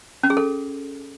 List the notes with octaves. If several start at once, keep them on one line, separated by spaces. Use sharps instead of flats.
C#4
G#4
A4